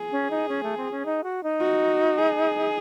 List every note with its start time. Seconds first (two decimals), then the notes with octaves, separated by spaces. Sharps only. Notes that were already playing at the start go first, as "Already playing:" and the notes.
Already playing: G#4
0.12 C#4
0.31 D#4
0.49 C#4
0.63 A3
0.77 C4
0.91 C#4
1.06 D#4
1.24 F#4
1.43 D#4
1.61 F#4
2.18 G#4